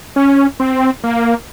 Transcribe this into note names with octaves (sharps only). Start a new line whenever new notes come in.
C#4
C4
A#3